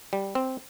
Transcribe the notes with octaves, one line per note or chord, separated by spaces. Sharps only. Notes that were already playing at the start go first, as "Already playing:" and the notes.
G3
C4